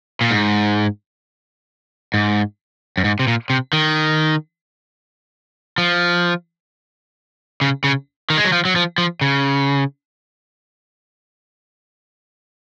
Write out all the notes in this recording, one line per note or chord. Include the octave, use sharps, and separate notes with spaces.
A#2
G#2
G#2
F#2
G#2
C3
A#2
C3
D#3
F3
C#3
C#3
D#3
G#3
F#3
F3
F#3
F3
F3
C#3